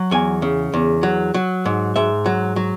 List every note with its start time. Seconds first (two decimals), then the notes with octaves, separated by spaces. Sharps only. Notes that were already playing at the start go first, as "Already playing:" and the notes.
Already playing: F#3
0.11 E2 G#5
0.42 C#3
0.74 E2
1.03 F#3
1.34 F#3
1.66 G#2
1.96 G#2 E5
2.26 F#3
2.56 F#3